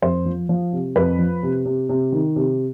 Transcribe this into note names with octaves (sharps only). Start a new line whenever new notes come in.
F2 C5
F3
F3
C3
F2 B4
F3
C3
C3
C3
D#3
C3